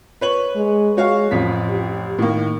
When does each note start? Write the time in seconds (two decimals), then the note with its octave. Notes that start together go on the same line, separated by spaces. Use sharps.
0.21 B4 C#5 F#7
0.55 G#3
0.97 G#3 F#4 C#5 F5
1.31 A1 F2 F4 B6
1.69 G4
2.19 A2 D#3 A#3